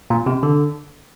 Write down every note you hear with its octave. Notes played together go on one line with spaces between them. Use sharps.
A#2
C3
D3